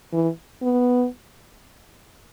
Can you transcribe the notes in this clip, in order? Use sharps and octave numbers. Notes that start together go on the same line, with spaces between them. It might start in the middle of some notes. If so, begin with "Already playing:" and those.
E3
B3